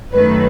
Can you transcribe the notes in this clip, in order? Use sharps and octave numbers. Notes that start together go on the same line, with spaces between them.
F#2 D#3 A3 B4